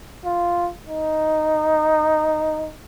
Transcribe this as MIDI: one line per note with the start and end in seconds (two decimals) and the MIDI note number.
0.25 0.68 65
0.89 2.71 63